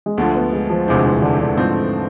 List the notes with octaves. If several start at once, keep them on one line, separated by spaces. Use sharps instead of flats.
G#3
D2 D3 F3 A3
B3
G#3
F3
E1 D2 C3 E3 G#3 C4
E3
D3
D3
G#2 F3 A3 C4